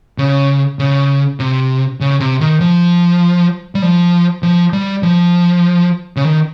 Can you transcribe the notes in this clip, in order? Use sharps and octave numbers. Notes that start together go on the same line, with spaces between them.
C#3
C#3
C3
C#3
C3
D#3
F3
G3
F3
F3
G3
F3
C#3
D#3